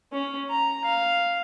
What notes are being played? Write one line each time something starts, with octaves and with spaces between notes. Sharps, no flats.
C#4
A#5
F5